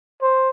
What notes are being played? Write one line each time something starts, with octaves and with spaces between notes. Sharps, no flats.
C5